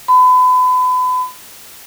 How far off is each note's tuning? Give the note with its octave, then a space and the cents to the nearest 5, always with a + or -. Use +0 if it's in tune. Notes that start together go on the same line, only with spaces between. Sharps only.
B5 +35